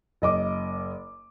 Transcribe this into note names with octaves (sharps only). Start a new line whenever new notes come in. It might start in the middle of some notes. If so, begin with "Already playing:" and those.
F#1 D#5 D6